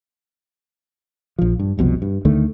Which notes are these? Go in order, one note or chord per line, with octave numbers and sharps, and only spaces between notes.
A#1 F3
G2
F#1 C2 B2 F3
G2
D2 D3 D#3 A3